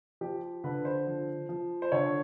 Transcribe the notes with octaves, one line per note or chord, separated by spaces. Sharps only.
F3 G4
D3 B4
C5
F3
F3
C5
D3 C#5